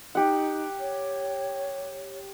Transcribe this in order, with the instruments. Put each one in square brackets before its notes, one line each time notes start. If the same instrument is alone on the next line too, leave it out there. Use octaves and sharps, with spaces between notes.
[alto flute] D#4 [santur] G4 F#5
[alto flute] C#5